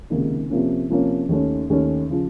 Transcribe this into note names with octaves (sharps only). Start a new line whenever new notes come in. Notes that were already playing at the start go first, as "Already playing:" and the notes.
C#2 C3 D#3 A#3 D#4
C3 F3 A#3 C#4
C3 F3 A#3 C#4
D#2 D#3 A3 C#4
D#2 D#3 A3 C#4
C#3 F3